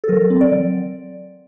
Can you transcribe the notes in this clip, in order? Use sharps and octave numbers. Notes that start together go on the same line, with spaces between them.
A4
F#3 A#4
C4
D5
F#3